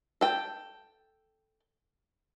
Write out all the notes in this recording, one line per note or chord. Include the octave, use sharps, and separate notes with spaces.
A4 G5